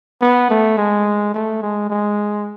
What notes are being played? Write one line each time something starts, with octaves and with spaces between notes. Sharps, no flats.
B3
A3
G#3
A3
G#3
G#3